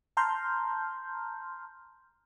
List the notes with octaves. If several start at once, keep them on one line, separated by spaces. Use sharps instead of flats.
A5 A#5 C6 F6 G6